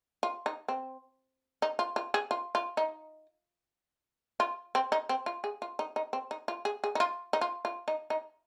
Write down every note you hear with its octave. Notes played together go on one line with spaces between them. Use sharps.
F4
D#4
C4
D#4
F4
F4
G#4
F4
F4
D#4
F4
C4
D#4
C4
F4
G#4
F4
D#4
D#4
C4
D#4
F4
G#4
G#4
D#4
F4
D#4
F4
F4
D#4
D#4